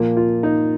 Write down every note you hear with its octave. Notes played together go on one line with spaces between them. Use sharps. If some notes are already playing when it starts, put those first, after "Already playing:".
Already playing: A#2 F3 A#3
F4
D#4